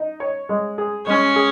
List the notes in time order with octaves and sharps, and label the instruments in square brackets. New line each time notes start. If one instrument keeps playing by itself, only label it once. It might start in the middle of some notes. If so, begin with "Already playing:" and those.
Already playing: [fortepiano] D#4
C#5
G#3
G#4
[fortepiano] G#3 [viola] C#4
[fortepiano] G#4